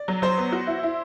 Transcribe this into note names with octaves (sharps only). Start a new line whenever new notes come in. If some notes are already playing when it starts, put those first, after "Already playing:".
Already playing: D5
F#3
F#3 C5
B3
F#4
E4
E4